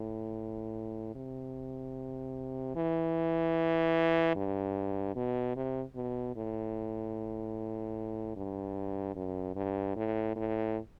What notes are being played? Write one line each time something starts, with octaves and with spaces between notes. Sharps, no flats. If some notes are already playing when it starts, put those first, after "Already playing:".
Already playing: A2
C3
E3
G2
B2
C3
B2
A2
G2
F#2
G2
A2
A2